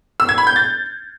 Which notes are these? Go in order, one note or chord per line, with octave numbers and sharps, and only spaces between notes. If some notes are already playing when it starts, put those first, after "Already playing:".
E6
G#6
B5
G6
A6